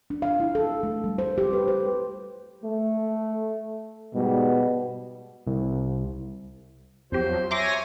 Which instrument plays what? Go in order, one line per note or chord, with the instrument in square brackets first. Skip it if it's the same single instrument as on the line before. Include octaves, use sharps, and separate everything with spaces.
[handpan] D4
F5
E4
A4
A3
G3
C5
G4
B4
C5
[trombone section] A3
[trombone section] G#2 G3 [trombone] B2
[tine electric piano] C2
[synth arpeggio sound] F2 G4 [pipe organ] F3 F#3 [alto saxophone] C5
[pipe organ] C#5 G#5 A#6 [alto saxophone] E5 [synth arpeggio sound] A#5 C6 D6